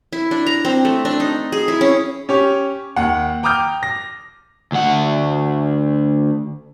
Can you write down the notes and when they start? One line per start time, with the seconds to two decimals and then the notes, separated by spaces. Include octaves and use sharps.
0.13 E4
0.31 D4
0.47 A#5
0.65 C4
0.85 A3
1.05 D4
1.20 D#4
1.52 G#4
1.68 E4
1.81 C#4
2.29 C#4 G4 C#5
2.96 D#2 F#5
3.43 G5 A#5 D6 D#6 F6 G6
3.83 A#6
4.72 D2 F#5